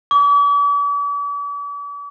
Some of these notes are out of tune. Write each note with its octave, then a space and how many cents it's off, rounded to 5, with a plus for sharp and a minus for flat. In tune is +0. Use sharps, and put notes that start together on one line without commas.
D6 -45